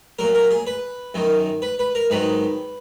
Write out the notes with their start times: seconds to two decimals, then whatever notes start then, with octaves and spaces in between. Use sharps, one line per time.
0.19 A#2 F#3 A#4
0.35 A#4
0.51 G#4
0.67 B4
1.14 F#2 D#3 F#3
1.62 B4
1.79 B4
1.95 A#4
2.10 G#2 D#3 F#3 B4